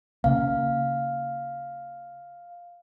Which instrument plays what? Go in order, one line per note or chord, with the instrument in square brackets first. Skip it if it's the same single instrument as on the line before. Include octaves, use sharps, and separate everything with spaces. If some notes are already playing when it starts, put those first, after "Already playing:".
[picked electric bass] C#3 A#3 [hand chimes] F5